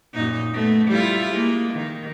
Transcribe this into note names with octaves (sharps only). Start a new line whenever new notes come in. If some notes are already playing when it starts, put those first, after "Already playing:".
F#2 A#2 D#4
A3 B3
G3 E4 F4
G#3 A#3
D#3